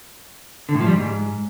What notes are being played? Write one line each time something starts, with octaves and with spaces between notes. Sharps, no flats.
D3
A2
F3
G3
G#2